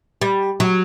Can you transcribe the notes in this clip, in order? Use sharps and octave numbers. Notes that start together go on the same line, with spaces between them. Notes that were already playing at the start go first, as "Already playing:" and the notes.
G3
F#3